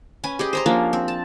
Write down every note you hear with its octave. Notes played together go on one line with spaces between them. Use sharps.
C#4 B4 G#5
G4 G#4 D#5
C5 A#5 C6
F3 A#3 C#4 D4
C4
A5